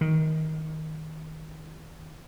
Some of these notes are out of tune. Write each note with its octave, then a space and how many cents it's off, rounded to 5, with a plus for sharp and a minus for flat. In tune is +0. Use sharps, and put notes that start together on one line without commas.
D#3 +15